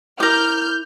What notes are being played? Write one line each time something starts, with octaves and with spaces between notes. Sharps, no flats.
E4 A#4 D6 F6 G6